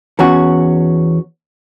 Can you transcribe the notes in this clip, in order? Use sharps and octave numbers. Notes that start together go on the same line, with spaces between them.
E2 C#4 F#4